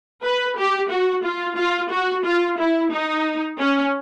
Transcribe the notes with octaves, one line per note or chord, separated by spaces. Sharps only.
B4
G4
F#4
F4
F4
F#4
F4
E4
D#4
C#4